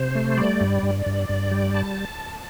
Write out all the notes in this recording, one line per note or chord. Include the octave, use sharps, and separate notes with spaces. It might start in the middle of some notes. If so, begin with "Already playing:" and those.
Already playing: C3 C5
A3
G3 D5
G2
G2
G2
G2
G3
A5